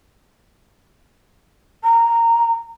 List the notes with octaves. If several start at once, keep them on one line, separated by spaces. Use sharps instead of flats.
A#5